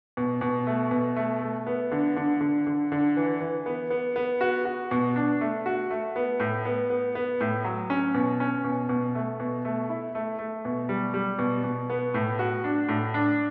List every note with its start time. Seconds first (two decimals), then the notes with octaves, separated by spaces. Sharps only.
0.17 B2
0.41 B2
0.67 A3
0.91 B2
1.16 A3
1.42 A3
1.67 B3
1.92 D3
2.16 D3
2.41 D3
2.67 D3
2.92 D3
3.16 E3
3.40 E3
3.66 B3
3.90 B3
4.16 B3
4.41 F#4
4.65 F#4
4.91 B2
5.16 D4
5.41 A3
5.66 F#4
5.91 A3
6.16 B3
6.40 A2
6.65 B3
6.90 B3
7.15 B3
7.40 A2
7.64 F#3
7.90 C#4
8.14 B2
8.40 C#4
8.64 B2
8.89 B2
9.15 A3
9.40 B2
9.65 A3
9.89 E4
10.15 A3
10.39 A3
10.65 B2
10.89 G3
11.14 G3
11.39 B2
11.64 B2
11.90 B3
12.14 A2
12.39 F#4
12.64 D4
12.89 A2
13.14 D4